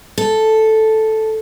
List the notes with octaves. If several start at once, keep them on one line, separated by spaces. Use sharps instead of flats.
A4